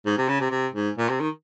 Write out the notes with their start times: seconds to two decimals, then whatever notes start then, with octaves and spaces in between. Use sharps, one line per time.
0.06 G#2
0.18 C3
0.28 C#3
0.40 C3
0.51 C3
0.74 G#2
0.98 A#2
1.09 C3
1.20 D#3